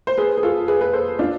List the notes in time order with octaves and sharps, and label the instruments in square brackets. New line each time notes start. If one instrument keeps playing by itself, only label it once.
[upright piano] C5
G#4 B4
G#4
F4 A4
G#4 B4
G#4 B4
A4 C5
D4 F4